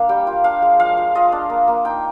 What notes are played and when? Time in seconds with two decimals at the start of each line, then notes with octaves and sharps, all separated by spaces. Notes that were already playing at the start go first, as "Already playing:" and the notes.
Already playing: A#3 D4 F5
0.09 G3 G5
0.27 F4
0.44 D4 F5
0.62 G#3
0.79 F3 F5
0.97 F3
1.15 F4 D#5
1.32 D4
1.50 A#3
1.68 A#3
1.85 D#4 G5